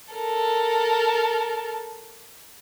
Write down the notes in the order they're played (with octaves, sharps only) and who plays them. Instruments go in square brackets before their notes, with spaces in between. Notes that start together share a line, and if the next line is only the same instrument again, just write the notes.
[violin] A4 A#4